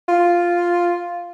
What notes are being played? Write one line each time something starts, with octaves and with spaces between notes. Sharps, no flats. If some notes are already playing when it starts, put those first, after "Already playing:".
F4